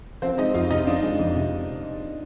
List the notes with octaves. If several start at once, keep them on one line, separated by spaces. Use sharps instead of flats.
F3 C4 C5
G#3 D#4 D#5
F2 F4 F5
C3 D#4 D#5
F3 D4 D5
G#3
F2
C3